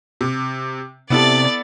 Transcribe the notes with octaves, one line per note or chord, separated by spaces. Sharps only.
C3
C3 B3 E4 A4 D5 A6